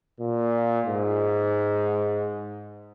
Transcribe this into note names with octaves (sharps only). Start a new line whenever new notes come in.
A#2
G#2